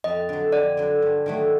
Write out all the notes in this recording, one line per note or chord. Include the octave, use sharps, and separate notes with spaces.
F2 D#5
D3 F#3
F2 D5
D3 F#3
G2
D#3 F#3 A3